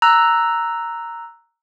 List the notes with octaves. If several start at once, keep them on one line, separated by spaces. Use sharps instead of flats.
A#5 E6 F#6